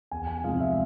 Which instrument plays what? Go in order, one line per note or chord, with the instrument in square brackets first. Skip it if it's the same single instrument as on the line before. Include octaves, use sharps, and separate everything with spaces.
[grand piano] E2 G#5
G#5
C3 F3 G#3 F5
E5